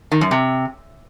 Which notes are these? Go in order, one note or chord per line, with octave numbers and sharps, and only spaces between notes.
D#3
F#2
C3